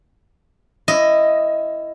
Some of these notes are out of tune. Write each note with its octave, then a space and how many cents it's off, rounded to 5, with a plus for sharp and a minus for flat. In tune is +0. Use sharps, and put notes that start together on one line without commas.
E4 +15 D#5 +0